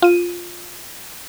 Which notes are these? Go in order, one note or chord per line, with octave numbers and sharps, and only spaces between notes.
F4 D#7